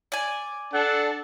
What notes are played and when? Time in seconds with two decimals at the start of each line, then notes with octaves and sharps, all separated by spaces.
0.12 D5 G#5
0.74 D4 A4 F#5